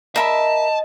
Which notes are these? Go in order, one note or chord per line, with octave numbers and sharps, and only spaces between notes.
A#4 D#5 E5 A5 B5